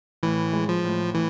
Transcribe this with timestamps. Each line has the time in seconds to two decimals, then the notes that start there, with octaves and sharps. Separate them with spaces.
0.23 A2 E3
0.53 G#3
0.69 F3
0.84 A2
1.14 A2 E3